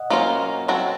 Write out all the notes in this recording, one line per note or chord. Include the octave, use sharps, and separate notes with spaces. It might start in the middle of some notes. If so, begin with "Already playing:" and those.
Already playing: D#5 F#5
F#3 A#3 C#4 F4 C5
F#3 C4 F#4 A4